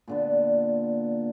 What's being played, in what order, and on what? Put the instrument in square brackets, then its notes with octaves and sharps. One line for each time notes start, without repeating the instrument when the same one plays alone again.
[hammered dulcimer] A#2 D3 B3